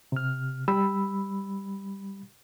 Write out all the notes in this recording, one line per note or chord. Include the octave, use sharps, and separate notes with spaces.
C3 F6
G3 B5 E6